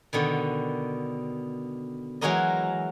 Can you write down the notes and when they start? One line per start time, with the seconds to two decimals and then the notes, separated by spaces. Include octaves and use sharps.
0.13 B2 D3 D#3
2.21 E3 F#3 G#3 F#4 A#4 D#5